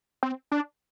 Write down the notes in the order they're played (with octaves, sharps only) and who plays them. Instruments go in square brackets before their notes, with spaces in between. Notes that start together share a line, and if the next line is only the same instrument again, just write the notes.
[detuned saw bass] C4
D4